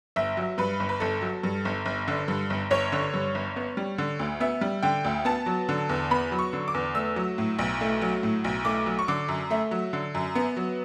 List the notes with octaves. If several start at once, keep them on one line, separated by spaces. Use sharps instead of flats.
G1 E5
F#3
G2 B4
G1
B4
G1 A4
F#3
G2
G1
G1
D3
G2
G1
G1 C#5
D3
G2
G1
B3
G3
D3
D2
B3 E5
G3
D3 G5
D2
B3 A5
F#3
D3
E2
B3 B5
F#3
C#6
D3
D6
E2
A3 E6
F#3
A2
B1
A3
F#3
A2
B1
A3 D6
F#3
C#6
D3 D6
F#2
A3 E5
F#3
D3
F#2
B3
F#3